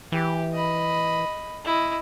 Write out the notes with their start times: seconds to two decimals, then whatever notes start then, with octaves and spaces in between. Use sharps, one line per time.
0.12 E3 G4
0.53 D#5 B5
1.64 E4 D#5